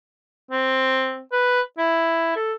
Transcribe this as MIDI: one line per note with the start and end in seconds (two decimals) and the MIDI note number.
0.51 1.21 60
1.32 1.61 71
1.78 2.34 64
2.36 2.53 69